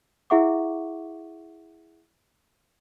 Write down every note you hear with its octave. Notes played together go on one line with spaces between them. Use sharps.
E4 G#4 E5 F#5 C#6 D6